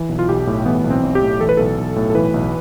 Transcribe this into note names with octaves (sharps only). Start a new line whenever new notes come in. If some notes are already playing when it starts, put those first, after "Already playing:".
Already playing: E3
B1
F4
B1 G4
A2
E3 B3
B1
C4
B1
G4
A2
E3 A4
B4
B1 A4
B1
A2
A4
E3 B4
B1